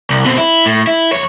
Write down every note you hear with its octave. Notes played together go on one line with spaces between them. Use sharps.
C2
B2 C4
E4
A2
E4
F2 C#5